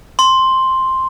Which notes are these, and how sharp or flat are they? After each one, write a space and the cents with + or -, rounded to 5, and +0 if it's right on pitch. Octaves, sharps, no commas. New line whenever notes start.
C6 +5